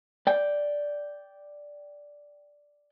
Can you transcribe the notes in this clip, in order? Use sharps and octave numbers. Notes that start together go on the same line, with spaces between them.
D5 G5